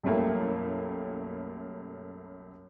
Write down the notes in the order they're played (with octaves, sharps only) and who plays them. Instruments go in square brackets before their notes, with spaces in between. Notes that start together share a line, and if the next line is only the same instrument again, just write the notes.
[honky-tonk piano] B1 F#2 G3 A3 A#3 E4